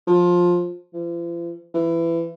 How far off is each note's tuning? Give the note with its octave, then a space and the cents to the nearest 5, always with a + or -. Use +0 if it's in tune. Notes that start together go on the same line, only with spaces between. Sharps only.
F3 +15
F3 -45
E3 +20